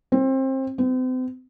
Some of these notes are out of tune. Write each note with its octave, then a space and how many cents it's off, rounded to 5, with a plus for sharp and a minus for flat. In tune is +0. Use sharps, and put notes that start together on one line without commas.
C4 +25
C4 -40